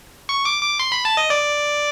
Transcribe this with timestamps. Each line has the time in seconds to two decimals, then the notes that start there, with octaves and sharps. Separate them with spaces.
0.29 C#6
0.45 D6
0.62 D6
0.79 C6
0.92 B5
1.05 A5
1.17 D#5
1.30 D5